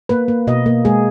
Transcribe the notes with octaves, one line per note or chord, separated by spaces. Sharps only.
A#3 B4
A#3
B2 D#5
A#3
G#3 G#4